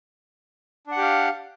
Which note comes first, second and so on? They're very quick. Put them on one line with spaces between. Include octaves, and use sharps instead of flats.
D4 F#5 G4 F5